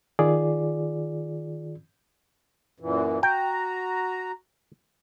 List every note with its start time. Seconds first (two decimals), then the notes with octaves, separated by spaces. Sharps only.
0.19 D#3 F4 G#4 D5
2.80 F#2 A#2 E3
3.23 F#4 G5 A#5